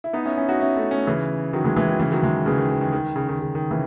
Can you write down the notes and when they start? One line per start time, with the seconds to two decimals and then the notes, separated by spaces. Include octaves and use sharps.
0.04 E4
0.13 B3 D#4
0.25 C#4 E4
0.37 C#4 E4
0.49 D#4 F#4
0.61 C#4 E4
0.76 A3 C#4
0.91 A3 C#4
1.07 C#3 E3
1.53 D#3 F#3
1.64 E3 G#3
1.76 E3 G#3
1.88 D#3 F#3
2.00 C#3 E3
2.12 D#3 F#3
2.23 E3 G#3
2.46 C#3 E3
2.58 D#3
2.70 D#3
2.81 D#3
2.92 D#3
3.16 C#3
3.29 D#3
3.39 C#3
3.55 D#3
3.71 C#3 E3